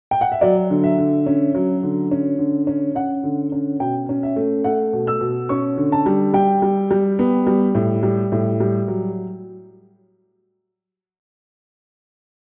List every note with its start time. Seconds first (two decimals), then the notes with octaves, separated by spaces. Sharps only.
0.11 G5
0.21 F#5
0.32 E5
0.41 F#3 D5
0.70 D3
0.84 E5
0.98 D3
1.26 C#4
1.55 F#3
1.83 D3
2.11 C#4
2.39 D3
2.67 C#4
2.95 C#4 F#5
3.24 D3
3.52 C#4
3.80 B2 G5
4.09 C#4
4.23 E5
4.36 A3
4.64 A3 F#5
4.93 B2
5.07 E6
5.21 B2
5.49 C#4 C#6
5.77 D3
5.92 A5
6.06 G3
6.34 G3 G5
6.62 G3
6.91 G3
7.19 B3
7.47 G3
7.75 A2
8.03 G3
8.32 A2
8.60 G3
8.88 F#3